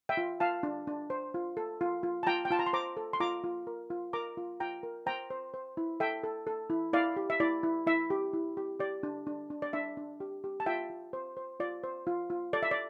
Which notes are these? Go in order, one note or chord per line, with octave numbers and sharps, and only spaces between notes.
E5 G5
F4
F4 F5 A5
D4
D4
C5
F4
A4
F4
F4
A5
F4 G5 A#5
G5
F4 A5
A#5
C6
C5 A#5 D6
A4
C6
F4 A#5 D6
F4
A#4
F4
A#4 A#5 D6
F4
F4 G5 A#5
A#4
C5 G5 A#5
C5
C5
E4
A4 E5 G5
A4
A4
E4
E4 D5 F5
G4
E5
E4 D5
E4
E4 E5
G4
E4
G4
G4 D5
D4
D4
D4
D5
D4 E5
D4
G4
G4
A5
F4 E5 G5
F4
C5
C5
F4 D5
C5
F4
F4
A4 D5
E5
D5